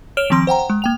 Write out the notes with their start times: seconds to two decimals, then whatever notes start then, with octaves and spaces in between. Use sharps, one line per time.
0.17 C#5 F6 D7 E7 F7 G7
0.30 D#3 F3 C4 C6 D7
0.47 C5 F#5 G5 A#5
0.70 G#3
0.82 A#3 G5 F7